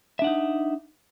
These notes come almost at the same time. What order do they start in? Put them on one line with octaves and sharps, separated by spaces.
E5 D4 F#5 D#4